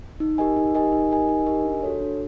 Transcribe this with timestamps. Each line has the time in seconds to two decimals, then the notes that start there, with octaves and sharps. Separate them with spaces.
0.20 D#4
0.38 G4 A#4 D#5 G#5
0.56 D#4
0.75 G4 A#4 D#5 G#5
0.92 D#4
1.11 G4 A#4 D#5 G#5
1.29 D#4
1.46 G4 A#4 D#5 G#5
1.65 D4
1.83 F#4 A4 C#5
2.01 D4